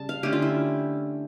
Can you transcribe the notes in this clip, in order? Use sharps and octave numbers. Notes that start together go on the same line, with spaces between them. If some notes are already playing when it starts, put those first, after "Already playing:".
Already playing: C#3 G3 A5
F5
D3 A3 C#4 G4
F4
E4